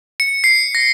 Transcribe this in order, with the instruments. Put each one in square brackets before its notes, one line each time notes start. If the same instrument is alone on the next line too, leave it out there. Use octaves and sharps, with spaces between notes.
[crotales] C#7
C7
A#6